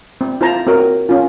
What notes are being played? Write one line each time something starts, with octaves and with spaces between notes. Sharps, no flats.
C4
E4 F4 C5 A5 A#5
C4 F#4 A#4 C#5
C#4 F4